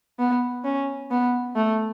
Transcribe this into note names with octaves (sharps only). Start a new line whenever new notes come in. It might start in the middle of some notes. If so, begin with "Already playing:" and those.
B3
C#4
B3
A3